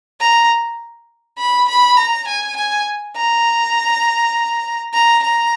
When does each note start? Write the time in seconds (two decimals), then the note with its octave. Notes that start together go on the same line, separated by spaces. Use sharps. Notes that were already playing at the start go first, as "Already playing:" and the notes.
0.20 A#5
1.38 B5
1.69 B5
1.97 A#5
2.28 G#5
2.56 G#5
3.16 A#5
4.94 A#5
5.23 A#5